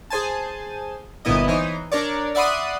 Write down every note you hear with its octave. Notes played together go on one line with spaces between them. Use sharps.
G#4 C5 G#5 A5
G1 D2 A#2 B3 E4 D#5
E3 D#4 C5 C#5
D4 A#4 C#5 D5
D5 E5 F#5 B5 C6 D#6